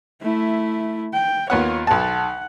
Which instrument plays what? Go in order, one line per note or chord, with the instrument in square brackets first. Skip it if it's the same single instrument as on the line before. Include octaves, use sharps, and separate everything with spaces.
[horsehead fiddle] A3 E4
G5
[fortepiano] D#2 B3 F#5 [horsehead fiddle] F4 C#5
[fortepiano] B1 A5 [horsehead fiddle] F#5